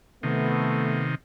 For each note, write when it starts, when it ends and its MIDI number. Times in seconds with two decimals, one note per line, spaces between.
0.23 1.15 48
0.23 1.15 51
0.23 1.08 57
0.23 1.08 59